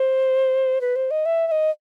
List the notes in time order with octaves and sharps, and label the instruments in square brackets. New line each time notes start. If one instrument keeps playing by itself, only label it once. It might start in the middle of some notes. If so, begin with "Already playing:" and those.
Already playing: [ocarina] C5
B4
C5
D#5
E5
E5
D#5